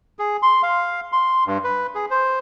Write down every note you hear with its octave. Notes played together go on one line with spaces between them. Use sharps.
G#4
C6
F5
C6
G2
B4
G#4
C5